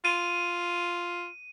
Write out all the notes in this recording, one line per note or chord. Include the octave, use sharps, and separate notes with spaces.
F4 D#7